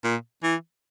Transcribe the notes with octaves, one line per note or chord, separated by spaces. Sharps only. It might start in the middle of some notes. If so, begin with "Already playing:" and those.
A#2
E3